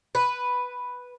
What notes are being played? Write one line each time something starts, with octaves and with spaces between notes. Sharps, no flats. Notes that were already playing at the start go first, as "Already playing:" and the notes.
B4